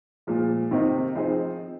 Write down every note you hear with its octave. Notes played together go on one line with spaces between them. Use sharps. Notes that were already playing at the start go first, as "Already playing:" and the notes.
A#2 F3 G#3
C3 D#3 C4 D#4
F3 C4 D#4 G#4 C5